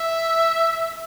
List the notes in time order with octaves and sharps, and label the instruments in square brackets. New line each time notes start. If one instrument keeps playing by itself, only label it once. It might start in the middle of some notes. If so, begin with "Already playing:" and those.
Already playing: [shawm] E5